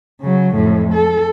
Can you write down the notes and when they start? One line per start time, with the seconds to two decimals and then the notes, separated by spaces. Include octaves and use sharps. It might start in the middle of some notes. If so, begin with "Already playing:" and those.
0.21 C#3 F#3
0.54 F2 A2
0.94 A4